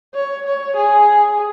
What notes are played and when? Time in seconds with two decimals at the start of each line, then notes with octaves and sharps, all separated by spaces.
0.14 C#5
0.46 C#5
0.76 G#4